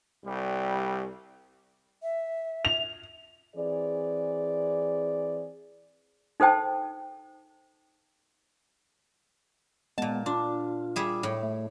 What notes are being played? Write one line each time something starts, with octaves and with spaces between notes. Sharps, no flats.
C2 G3
E5
F7
E3 C4 G#4 D5
D#4 A4 C5 G5 A5
A#2 G#3 B3 A5
D4 F4
G3 G#4 E5
A2
A3